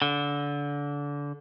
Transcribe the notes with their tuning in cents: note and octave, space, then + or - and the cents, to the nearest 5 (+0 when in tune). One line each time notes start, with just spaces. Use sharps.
D3 -25